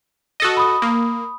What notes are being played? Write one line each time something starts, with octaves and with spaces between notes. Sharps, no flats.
F#4 A4 D#5
B5 D#6
A#3